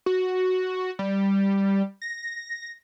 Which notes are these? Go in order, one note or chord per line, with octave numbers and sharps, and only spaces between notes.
F#4
G3
A#6